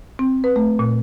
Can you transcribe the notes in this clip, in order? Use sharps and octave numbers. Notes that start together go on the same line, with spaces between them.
C4
B4
A3
A#2